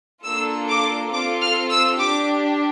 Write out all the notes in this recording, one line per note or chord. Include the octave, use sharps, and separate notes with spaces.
A#3 D4 F4 A4 E6
D6
C4 F4 A4 D6
F6
E6
D4 G4 D6